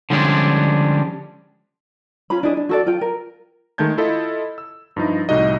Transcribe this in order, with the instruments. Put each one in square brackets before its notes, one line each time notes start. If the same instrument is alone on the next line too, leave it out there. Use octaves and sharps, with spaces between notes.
[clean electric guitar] D3 F3 G3 G#3 C#4 D4
[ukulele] C#4 F4 B5
D4 E4 G#4 D#5
D4
F#4 A4 D5
F4 G5
A#4
[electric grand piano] D#3 G#3 A3 A5 G6 G#6
E4 F4 A4 D#5 B5
E6
G2 F3 D#4 E4
C2 A2 G3 D#4 F#4 D#5